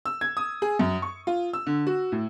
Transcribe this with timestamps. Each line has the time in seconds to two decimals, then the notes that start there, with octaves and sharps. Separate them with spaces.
0.05 E6
0.21 G#6
0.37 D#6
0.62 G#4
0.79 F#2
1.02 C#6
1.27 F4
1.53 E6
1.67 D3
1.87 F#4
2.12 A2